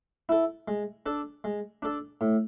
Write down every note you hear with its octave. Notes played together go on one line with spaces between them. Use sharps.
E4 A4
G#3
D4 A4 D5
G#3
D4 A4 D5
A2